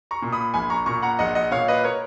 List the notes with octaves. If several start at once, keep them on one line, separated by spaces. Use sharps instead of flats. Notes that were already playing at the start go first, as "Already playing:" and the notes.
A#5 C#6
A#2
B5 D#6
A#1 G#5 B5
A#5 C#6
A#2 A#5 C#6
F#5 A#5
A#1 D#5 F#5
D#5 F#5
A#2 C#5 F5
B4 D#5
A#4 C#5